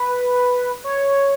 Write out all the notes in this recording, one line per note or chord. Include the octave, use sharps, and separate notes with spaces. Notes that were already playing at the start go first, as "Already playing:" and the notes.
Already playing: B4
C#5